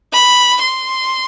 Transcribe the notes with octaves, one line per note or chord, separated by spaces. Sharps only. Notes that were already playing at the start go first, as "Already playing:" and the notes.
B5
C6